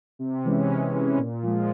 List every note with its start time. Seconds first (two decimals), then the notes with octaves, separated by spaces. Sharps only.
0.19 C3
0.45 E3 G#3 C#4
0.69 C3
0.94 E3 G#3 C#4
1.18 A#2
1.43 F3 G#3